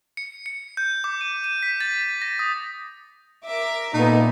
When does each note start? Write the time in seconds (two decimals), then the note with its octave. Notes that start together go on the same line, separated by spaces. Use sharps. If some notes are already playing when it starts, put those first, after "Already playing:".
0.17 C#7
0.46 C#7
0.77 G6
1.04 D6
1.21 D#7
1.44 D#7
1.63 B6
1.81 A6
2.22 A#6
2.39 D#6
3.44 A#4 E5 D6
3.94 A#2 A3 B3 D#4